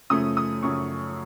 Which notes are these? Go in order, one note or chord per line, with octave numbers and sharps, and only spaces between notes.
F#2 C#3 F3 A3 C#4 D#6
D#6
F#2 C#3 F3 A3 C#4 C#6